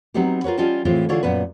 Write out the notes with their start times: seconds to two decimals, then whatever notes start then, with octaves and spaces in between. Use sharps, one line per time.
0.14 F#3 B3 C4 D#4 E4 G4
0.44 F4 A#4 B4 C#5
0.57 G3 C#4 F4 D#5 G5 A5
0.85 A2 E3 G#3 C4 F4 G4
1.09 D3 D4 E4 F4 G#4 C#5
1.23 F#2 A#2 B3 B4